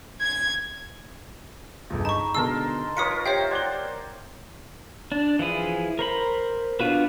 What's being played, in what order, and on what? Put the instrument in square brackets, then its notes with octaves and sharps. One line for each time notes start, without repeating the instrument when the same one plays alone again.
[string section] G#6
[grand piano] G1 C#2
[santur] D#4 [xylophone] A5 C#6 [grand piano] B5
[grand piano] B2 D3 G#3 [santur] A#4 A5 C6 [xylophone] E6
[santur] F4 A#4 C#5 [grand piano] B4 [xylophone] D#6 B6 C#7
[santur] G4 C5 [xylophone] C#5 E5 G5 [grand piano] C7 C#7
[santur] C5 D5 F#5 [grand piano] G#6 A6 G7
[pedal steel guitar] D4
E3 F3 E4 G#4
A#4 C5 B5
B3 D4 F4 F#4 B4